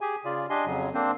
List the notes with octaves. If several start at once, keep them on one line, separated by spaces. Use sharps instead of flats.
G4 G#4 G#5
C#3 F4 D5
D4 G4 D#5 G#5 C6
F2 C#3 F#3
A#3 C4 D4 C5